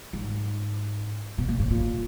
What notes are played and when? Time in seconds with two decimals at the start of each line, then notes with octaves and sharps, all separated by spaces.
0.13 G#2
1.38 B2
1.48 A#2
1.59 A2
1.70 A#2